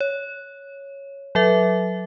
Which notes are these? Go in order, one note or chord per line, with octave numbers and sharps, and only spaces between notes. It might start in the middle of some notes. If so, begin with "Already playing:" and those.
C#5
F#3 A4 E5